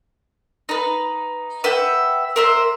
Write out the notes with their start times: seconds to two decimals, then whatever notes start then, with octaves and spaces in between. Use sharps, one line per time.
0.69 D#4 B4
1.64 B4 E5 F#5 G5
2.36 A#4 C5 E5